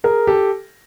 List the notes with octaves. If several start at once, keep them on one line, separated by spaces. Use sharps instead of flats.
G#4 A#4
G4 A4